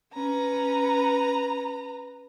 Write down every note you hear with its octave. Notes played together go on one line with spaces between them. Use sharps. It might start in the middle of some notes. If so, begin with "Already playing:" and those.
C#4 B4 A#5